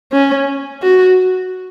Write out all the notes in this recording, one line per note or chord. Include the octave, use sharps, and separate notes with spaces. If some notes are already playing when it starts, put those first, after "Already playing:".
C#4
F#4